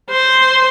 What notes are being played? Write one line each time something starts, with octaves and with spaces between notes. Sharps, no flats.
C5